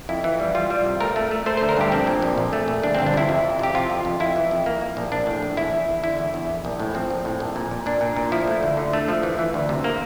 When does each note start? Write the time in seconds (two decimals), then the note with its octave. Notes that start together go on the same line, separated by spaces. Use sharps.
0.09 F2 E4
0.24 E3
0.40 G3
0.55 G3 F4
0.70 G3
0.85 C3
1.00 A3 A#4
1.16 A3
1.31 A3
1.46 A3 C5
1.57 D3 C5
1.69 A#4
1.77 G2 G4
1.92 A#1 C4
2.07 A#2
2.22 A#1
2.38 A#1
2.53 A3
2.68 A#1
2.83 G1 D4
2.95 G1 C4
3.06 D4
3.14 C3 E4
3.29 F2
3.44 F2
3.59 C3 G4
3.75 C3 F4
3.90 F2
4.05 F2
4.20 F2 E4
4.36 E3
4.51 F2
4.66 A#3
4.81 A#3
4.97 A#1
5.12 A#1 D4
5.27 A2
5.43 A#1
5.57 E2 E4
5.73 E2
5.89 E2
6.04 D3 E4
6.19 E2
6.34 E2
6.49 A#1
6.65 A#1
6.79 A2
6.95 F3 C4
7.10 A#1
7.25 A2
7.40 A#1
7.56 A#2
7.71 A#2
7.86 A#2 D4
8.01 A#2
8.16 A#2
8.32 F3 E4
8.47 A3
8.63 D2
8.77 D3
8.93 A3
9.08 F3
9.23 E3
9.39 E3
9.54 D2
9.69 C3
9.84 A#3